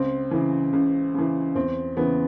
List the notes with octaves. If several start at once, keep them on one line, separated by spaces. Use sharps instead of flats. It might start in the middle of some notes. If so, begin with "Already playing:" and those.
Already playing: C#2 C4
C#3 E3
C#2
C#3 E3
E2 C4
C#3 E3 B3